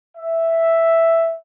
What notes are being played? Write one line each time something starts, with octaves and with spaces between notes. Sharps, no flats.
E5